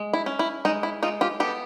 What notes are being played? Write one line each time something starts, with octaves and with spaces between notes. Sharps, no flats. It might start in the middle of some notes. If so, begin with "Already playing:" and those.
Already playing: G#3
E4
C#4
E4
G#3 D#4
E4
G#3 D#4 F4
F4 G4
B3 G4 A4